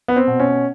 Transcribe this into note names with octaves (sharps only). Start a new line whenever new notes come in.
B3
C4
B2
C#4